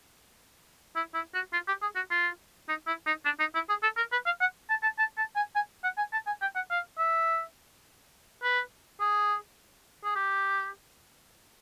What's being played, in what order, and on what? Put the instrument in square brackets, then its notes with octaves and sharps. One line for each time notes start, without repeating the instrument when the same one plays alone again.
[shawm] E4
E4
F#4
F4
G4
G#4
F#4
F4
D#4
E4
D#4
D4
D#4
E4
G#4
A4
A#4
B4
F5
F#5
A5
A5
A5
A5
G#5
G#5
F#5
G#5
A5
G#5
G5
F#5
F5
E5
B4
G#4
G#4
G4